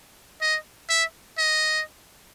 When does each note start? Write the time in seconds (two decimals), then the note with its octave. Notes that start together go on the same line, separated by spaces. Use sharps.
0.41 D#5
0.89 E5
1.38 D#5